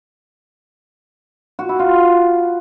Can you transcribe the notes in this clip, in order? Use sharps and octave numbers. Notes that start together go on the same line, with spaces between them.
F#4
E4
F4